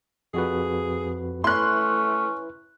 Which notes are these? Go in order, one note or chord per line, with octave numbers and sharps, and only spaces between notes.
F2 F#4 G#4 B4
A3 C#4 E4 B4 C6 F#6